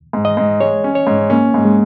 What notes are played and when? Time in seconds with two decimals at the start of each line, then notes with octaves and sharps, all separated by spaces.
0.13 G#2
0.25 D#5
0.37 G#2
0.60 G#3 C#5
0.84 C#4
0.95 C#5
1.07 G#2
1.30 A#3 C#4
1.54 G#2
1.65 G#3